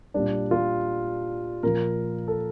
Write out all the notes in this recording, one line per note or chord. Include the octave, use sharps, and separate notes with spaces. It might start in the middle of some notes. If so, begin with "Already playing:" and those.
A#2 G3 D4
F4
A#2 F3 A#4
A4